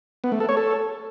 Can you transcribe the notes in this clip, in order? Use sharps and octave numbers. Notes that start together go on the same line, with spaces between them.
B3
A3
A4
C#5
A4